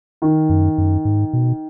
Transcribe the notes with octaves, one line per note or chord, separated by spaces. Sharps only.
D#3
F#2
F#2
G#2
B2